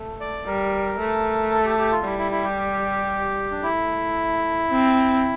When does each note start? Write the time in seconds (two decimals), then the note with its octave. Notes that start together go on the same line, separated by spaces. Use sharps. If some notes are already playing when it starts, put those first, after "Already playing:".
Already playing: A3
0.20 D5
0.46 G3 A#4
0.99 A3
1.52 A4
1.65 G4
1.78 G4
1.92 F4
2.04 G3 E4
2.18 E4
2.31 E4
2.44 G4
3.51 D4
3.62 A3 E4
4.69 C4